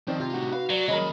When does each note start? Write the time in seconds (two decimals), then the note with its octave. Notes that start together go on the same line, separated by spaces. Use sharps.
0.08 D#3 F3 C4 D5
0.20 C3 F4
0.34 A2 D#4 F#4
0.53 B4 F5
0.70 F#3 D5
0.88 D#2 G#3 C#4 A#4 D#5 B5